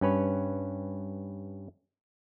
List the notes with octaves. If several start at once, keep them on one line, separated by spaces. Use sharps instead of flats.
G2 C#4 B4 C#5